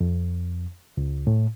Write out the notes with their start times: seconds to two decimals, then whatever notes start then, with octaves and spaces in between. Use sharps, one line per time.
0.01 F2
0.97 C#2
1.27 A2